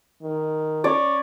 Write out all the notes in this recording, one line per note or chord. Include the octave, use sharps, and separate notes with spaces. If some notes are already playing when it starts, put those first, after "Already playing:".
D#3
C#4 D5